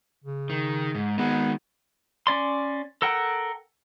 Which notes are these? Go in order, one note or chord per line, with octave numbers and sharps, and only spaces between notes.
C#3
D#3
G#2
D#3 G#3 B3
C#4 D5 C6
A4 A#4 F#5 G5